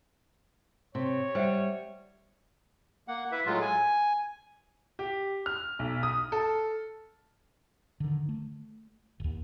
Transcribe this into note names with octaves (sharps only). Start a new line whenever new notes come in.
C3 C#5
G3 C5 E5 F#5
A#3 F#5
E4 B4 E5
A2 F#3 G#3 F4
G#5
G4
F6
B1
D#6
A4
D3 D#3
A3
E1 D#2